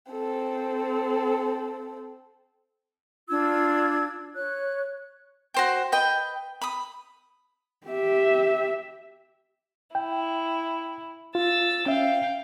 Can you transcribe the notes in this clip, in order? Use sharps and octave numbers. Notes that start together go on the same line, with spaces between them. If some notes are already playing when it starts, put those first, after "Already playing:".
C4 A4
D4 F4 E6 G#6
C#5 F#6
F#4 C5 G5
B4 D#5 G5
B5 D#6
G4 E5
E4 G5
F4 E6 A6
C#4 E5 F5 G5